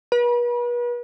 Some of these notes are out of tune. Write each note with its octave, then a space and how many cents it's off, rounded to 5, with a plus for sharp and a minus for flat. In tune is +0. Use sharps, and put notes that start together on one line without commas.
B4 -40